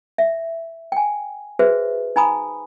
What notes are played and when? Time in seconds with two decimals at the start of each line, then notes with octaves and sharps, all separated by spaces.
0.18 E5
0.92 G5 G#5
1.59 F#4 G#4 B4 C5 E5
2.16 D#4 G#5 A#5 B5 D#6